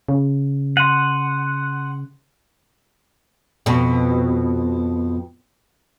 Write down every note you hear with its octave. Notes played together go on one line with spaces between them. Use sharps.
C#3
F#5 C6 D#7
F2 B2